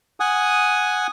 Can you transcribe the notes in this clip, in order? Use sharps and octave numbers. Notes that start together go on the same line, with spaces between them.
F#5 G#5 D#6